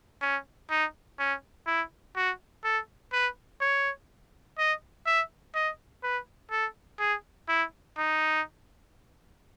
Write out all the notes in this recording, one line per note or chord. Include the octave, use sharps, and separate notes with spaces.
C#4
D#4
C#4
E4
F#4
A4
B4
C#5
D#5
E5
D#5
B4
A4
G#4
E4
D#4